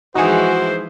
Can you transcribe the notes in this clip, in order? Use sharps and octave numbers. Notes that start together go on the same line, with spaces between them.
E3 F3 G#3 D#4 F#4 G#4 C5